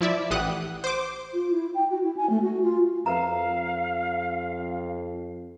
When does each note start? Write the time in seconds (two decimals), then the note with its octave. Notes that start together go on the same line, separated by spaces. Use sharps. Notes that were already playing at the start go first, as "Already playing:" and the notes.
0.01 F3 E4 D5 E5
0.31 A1 E3 G4 F#5 D#6 F#6
0.84 C5 D6
1.33 F4
1.51 E4
1.74 G5
1.90 F#4
2.03 E4
2.17 G#5
2.30 A3
2.42 F#4
2.62 F4
3.06 F2 A#4 B4 F5 A#5